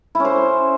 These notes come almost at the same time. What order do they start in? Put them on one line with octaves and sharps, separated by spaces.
E4 C#4 C5